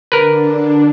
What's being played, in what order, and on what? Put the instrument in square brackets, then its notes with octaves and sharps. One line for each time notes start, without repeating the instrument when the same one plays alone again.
[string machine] D3 D4 [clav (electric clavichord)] A#4 B4